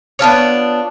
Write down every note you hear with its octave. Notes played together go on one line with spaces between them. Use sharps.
B3 D4 F4 C#5